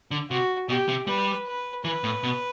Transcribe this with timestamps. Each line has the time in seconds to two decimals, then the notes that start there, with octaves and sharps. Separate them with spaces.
0.11 D3
0.30 C3 F#4
0.69 B2 G4
0.88 C3
1.07 G3 B4
1.47 B4
1.84 E3 B4
2.04 A2
2.23 B2